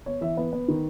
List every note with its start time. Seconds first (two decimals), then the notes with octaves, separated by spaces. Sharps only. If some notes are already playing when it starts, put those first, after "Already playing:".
0.06 B3 C#5
0.21 E3 E5
0.37 B3 B4
0.53 B3
0.68 D#3